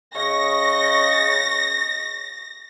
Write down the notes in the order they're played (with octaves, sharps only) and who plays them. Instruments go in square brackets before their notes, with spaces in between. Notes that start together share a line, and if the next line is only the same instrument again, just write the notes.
[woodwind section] C#3 D#5 C#6 [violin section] A#6